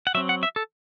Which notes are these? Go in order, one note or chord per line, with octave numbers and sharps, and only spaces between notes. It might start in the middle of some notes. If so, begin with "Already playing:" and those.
F#5
F#3 C4 E5
F#5
E5
A4